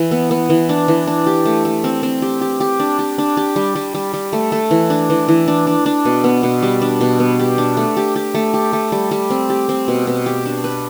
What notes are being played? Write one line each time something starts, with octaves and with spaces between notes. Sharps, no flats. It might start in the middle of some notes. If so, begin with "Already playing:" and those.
Already playing: E3
B3
B3
E3
D4
E3
D4
G4
A3
A3
C4
C4
G4
G4
G4
D4
G4
D4
G4
G3
G3
G3
G3
A3
A3
E3
D4
E3
E3
D4
D4
D4
B2
B3
B2
G3
D4
B2
B3
G4
D4
A3
G4
G4
A3
G4
A3
G3
G3
C4
G4
C4
B2
B2
G4
D4
B4